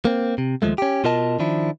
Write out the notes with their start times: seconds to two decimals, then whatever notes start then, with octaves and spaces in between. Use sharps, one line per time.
0.05 A#3 C4
0.38 C3
0.62 D#2 G#2 F3 G#3 A3
0.78 C#4 G4
1.04 B2 F4 A#4 D#5 A5
1.39 D#3 F3 D4 E4